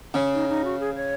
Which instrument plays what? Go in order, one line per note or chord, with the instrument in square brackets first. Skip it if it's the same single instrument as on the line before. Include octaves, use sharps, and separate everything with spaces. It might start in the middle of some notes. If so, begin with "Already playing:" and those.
[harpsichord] C#3
[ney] D#4
D#4
F#4
G#4
C#5